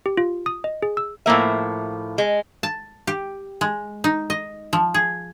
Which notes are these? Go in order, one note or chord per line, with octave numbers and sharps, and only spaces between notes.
G4
F4
D#6
D#5
G#4
E6
A2 F3 A#3 E5
G#3
A5
G4
G#3
D#4
D#5
F3
G#4